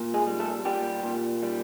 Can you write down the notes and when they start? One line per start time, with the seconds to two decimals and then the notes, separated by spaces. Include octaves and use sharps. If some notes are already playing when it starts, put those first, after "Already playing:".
Already playing: A#2
0.14 G#3 G#4
0.27 G3
0.39 A3 A4
0.65 A#2 G3 G4
1.03 A#2
1.43 G3